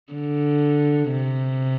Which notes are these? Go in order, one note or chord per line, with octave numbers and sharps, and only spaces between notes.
D3
C3